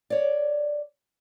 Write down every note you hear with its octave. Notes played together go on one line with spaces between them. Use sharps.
C#5 D5